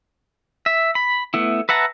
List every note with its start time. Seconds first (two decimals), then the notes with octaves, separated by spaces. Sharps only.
0.66 E5
0.95 B5
1.34 A3 B3 E4
1.69 B4 E5 F#5 A5 A#5